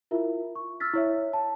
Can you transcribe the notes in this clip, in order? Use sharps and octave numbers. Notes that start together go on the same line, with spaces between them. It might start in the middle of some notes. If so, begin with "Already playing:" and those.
E4 F4 A#4 E5
C#6
E6 F6 A6 B6
E4 C#5 E5
A5